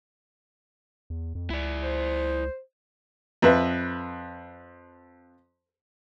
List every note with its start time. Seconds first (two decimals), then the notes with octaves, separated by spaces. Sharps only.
1.10 E2
1.35 F2
1.50 C#2 E4 D5
1.83 C5
3.42 F2 B4 E5